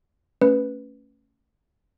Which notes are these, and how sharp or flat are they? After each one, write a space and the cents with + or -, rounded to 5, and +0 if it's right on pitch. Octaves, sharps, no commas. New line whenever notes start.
A3 +25 C#4 +0 B4 +0